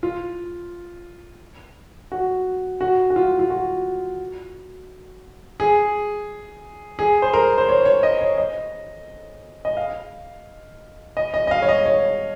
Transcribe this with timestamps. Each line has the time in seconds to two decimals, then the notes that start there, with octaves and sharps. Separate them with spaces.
0.03 F4
2.12 F#4
2.81 F#4
3.10 F#4
3.16 F4
3.39 F4
3.50 F#4
5.60 G#4
6.99 G#4
7.22 C5
7.33 A#4
7.58 C5
7.69 C#5
7.85 C#5
8.03 D#5
8.21 C#5
8.38 D#5
9.65 D#5
9.77 F5
11.17 D#5
11.34 D#5
11.47 D#5
11.51 F5
11.62 C#5
11.69 D#5
11.86 C#5